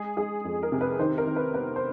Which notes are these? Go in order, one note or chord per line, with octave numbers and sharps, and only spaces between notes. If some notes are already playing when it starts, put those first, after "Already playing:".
Already playing: G#3 G#4
G#3 G#4
F2
A#4
C3
B4
D#3 C5
A#4
D#3
B4
B3 B4
C5